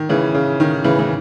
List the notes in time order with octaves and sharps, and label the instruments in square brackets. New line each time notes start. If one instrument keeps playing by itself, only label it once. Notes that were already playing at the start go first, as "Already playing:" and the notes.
Already playing: [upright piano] D#3
C#3 E3
C#3
D#3
C#3 E3
E3